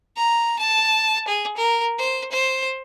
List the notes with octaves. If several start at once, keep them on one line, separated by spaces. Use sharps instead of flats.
A#5
A5
G#4
A#4
C5
C5